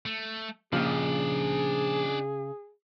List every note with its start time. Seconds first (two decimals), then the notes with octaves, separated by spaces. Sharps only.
0.06 A3
0.73 A#2 C#3 F3 D4 G4 G#4 D#5